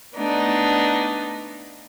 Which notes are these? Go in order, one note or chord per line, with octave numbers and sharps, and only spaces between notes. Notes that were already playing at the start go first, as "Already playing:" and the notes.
A3 B3 D4 D#4